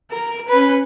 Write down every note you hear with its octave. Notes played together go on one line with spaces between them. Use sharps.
A#4
C#4 B4